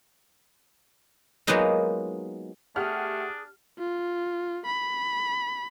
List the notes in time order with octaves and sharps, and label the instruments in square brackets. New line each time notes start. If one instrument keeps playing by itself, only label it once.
[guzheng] F#3 G#3 A#3 B3 D#4 F4
[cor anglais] A3 [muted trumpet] D4 [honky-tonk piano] G4 F#5 F6 [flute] G#4
[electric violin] F4
B5